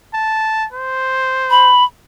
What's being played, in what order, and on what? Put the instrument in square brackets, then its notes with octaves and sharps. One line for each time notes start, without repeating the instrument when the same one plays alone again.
[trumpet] A5
C5
[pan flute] B5